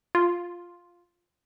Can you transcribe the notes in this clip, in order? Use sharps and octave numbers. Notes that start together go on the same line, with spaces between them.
F4